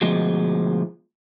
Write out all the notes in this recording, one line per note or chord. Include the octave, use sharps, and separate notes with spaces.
D2 B2 F3 G#3